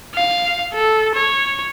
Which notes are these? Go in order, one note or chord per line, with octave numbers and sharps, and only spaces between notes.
F5
A4
C#5